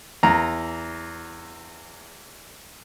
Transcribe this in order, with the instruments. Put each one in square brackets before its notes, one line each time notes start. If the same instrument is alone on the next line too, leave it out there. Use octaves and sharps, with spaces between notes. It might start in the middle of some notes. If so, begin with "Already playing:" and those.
[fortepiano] E2 A#5